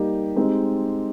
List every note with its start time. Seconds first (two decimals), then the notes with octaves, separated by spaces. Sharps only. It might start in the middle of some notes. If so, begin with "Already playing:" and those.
Already playing: G3 A#3 D#4 G4
0.36 G#3 C4 D#4 G4